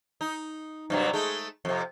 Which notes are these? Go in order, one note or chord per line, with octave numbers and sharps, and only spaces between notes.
D#4
G2 C3 F#3
G#3 A3 D#4
F2 C3